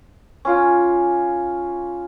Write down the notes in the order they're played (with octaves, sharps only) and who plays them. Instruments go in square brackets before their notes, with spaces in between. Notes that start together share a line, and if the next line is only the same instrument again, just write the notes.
[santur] C#4 F4 D6